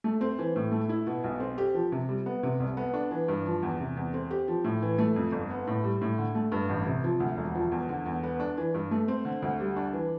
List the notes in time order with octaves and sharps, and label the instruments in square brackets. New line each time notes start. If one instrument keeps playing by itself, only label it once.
[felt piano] A3
C4
E3
A2
A3
E4
B2
B1
C4
G4
F3
C3
G3
B3
C3
C2
B3
D4
E3
G2
F3
E2
C3
E2
C4
G4
F3
A2
E3
A3
F2
G1
B3
A2
G3
A2
D3
A3
G2
A1
C3
F3
D2
E1
F3
E2
D3
E2
B3
D4
E3
G2
A3
C4
D3
D2
G3
D4
E3